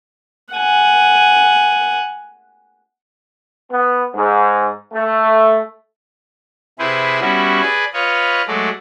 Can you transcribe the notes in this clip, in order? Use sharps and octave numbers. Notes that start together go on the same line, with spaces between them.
F#5 G#5
B3
G#2
A3
C3 E4 G#4 B4 C5
G3 B3 C#4 E4 F#4
G#4 B4 D5 G#5
F4 B4 C#5 D#5
F#3 G#3 A3 D5